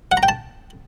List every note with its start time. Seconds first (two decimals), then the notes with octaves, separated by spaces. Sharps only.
0.12 F#5
0.17 A#5
0.23 G5
0.28 A5